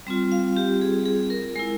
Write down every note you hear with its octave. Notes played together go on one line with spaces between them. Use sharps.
G3 C4 F4
F5
G4
G#4
G#4
A#4
G#3 E4 A#4